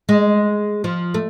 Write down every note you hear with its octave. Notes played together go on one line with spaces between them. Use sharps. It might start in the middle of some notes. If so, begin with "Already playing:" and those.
G#3
F3
A3